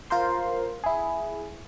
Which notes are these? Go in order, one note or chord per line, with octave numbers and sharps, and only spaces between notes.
F4 A#4 C5 C6
E4 G#4